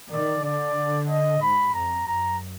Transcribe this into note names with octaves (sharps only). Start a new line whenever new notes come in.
D#3 D5
D3 D5
D#5
G#2 B5
F2 A#5
F#2 A#5